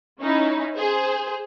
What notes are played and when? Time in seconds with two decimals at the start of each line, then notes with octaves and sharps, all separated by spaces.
0.20 C#4 D#4 E4
0.73 G#4 C5